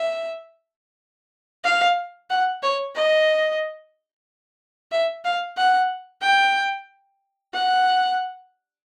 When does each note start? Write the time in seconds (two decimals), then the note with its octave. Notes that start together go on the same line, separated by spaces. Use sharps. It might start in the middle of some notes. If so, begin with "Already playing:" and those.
Already playing: E5
1.64 F5
2.30 F#5
2.63 C#5
2.95 D#5
4.92 E5
5.25 F5
5.57 F#5
6.22 G5
7.54 F#5